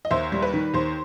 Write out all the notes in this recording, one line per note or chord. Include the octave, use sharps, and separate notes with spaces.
D#5
D#2 C5 E5
G3
B4
D#3
D#2 C5